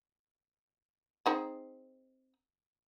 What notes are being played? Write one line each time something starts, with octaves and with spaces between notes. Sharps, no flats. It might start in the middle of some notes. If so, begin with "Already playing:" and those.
C4 D#4 G#4